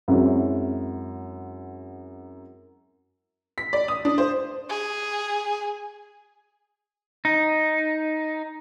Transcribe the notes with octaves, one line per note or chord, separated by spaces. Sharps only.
F#2 F#3 G#3 C4 E4 F#4
B6
D5
D#6
D4
C5
G#4
D#4